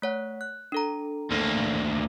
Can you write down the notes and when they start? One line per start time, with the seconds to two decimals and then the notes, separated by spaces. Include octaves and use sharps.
0.02 A3 C#5 F#5
0.41 F#6
0.72 D4 A4 A#5
1.31 D2 A#3 A4